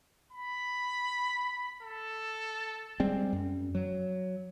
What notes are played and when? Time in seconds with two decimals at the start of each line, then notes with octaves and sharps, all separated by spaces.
0.33 B5
1.83 A4
3.00 G3 G#3 C4
3.33 F#2
3.75 F#3